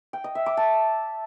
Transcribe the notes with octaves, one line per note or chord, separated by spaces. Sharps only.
G5
D#5
E5
D6
A5